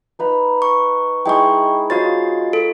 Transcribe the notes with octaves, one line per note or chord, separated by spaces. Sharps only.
D#4 B4 A#5
C#6
G#3 D#4 E4 G5 C#6
F4 F#4 C5 C#5 D#5 A6
A4